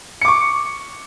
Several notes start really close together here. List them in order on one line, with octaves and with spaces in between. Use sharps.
C#7 D6 C#6